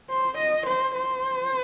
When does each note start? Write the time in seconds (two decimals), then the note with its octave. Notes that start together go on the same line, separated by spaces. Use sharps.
0.10 C5
0.38 D#5
0.67 C5
0.95 C5